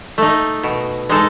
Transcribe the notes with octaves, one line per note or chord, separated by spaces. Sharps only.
A3 D#4
B2
G#3 D#4 A4